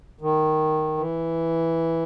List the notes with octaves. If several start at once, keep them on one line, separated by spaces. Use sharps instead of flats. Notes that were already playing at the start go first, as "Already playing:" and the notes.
D#3
E3